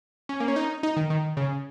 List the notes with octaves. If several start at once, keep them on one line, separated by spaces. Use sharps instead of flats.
C#4
A#3
C#4
D#4
D#4
D#3
D#3
C#3